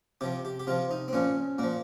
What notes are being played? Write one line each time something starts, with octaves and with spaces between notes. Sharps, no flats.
C3 F3 G4
G4
G4
C3 F3 F4
D#4
C4
A#2 F3 C#4
A#2 F3 A#3